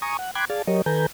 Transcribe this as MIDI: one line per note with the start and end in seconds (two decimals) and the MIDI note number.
0.02 0.17 80
0.02 0.17 82
0.02 0.17 85
0.02 0.17 87
0.19 0.31 78
0.35 0.45 79
0.35 0.45 83
0.35 0.45 84
0.35 0.45 86
0.35 0.45 90
0.35 0.45 92
0.50 0.62 68
0.50 0.62 74
0.50 0.62 77
0.50 0.62 81
0.67 0.82 54
0.67 0.82 67
0.67 0.82 70
0.67 0.82 73
0.67 0.82 75
0.86 1.06 51
0.86 1.06 69
0.86 1.06 71
0.86 1.06 80
0.86 1.06 82
0.86 1.06 91